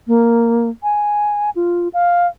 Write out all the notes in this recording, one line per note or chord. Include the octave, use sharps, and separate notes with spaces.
A#3
G#5
F4
F5